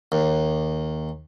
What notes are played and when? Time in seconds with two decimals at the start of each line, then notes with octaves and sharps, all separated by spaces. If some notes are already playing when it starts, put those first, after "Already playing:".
0.12 D#2